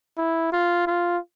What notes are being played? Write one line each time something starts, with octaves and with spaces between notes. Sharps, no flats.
E4
F4
F4